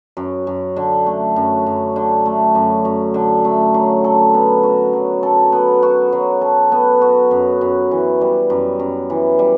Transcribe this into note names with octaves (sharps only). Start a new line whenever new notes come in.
F#2
F#2
D3
A3
F#2
F#2
D3
A3
F#2
F#2
D3
A3
F#3
A4
B3
F#4
F#3
A4
B3
F#4
F#3
A4
B3
F#4
F#2
F#2
E3
G3
F#2
F#2
E3
G3